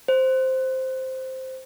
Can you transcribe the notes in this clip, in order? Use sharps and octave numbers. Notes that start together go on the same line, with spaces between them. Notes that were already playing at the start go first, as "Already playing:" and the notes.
C5